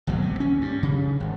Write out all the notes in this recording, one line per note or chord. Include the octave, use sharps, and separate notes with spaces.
G#1 D2 B2 F#3
C3
C#4
G2
C#3
G#1